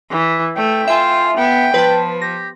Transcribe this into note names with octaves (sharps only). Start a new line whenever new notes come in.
E3
A3 G5
F4 E5 G#5
B3 G5
F3 B4 A5
G4 A#6